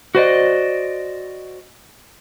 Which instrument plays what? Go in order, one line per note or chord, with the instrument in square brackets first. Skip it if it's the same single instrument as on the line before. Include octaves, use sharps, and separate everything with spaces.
[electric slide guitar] F#4 C5 D5 D#5